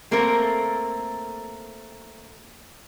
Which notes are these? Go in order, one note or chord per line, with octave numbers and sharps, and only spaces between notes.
A3 A#3 C4 A4 A#4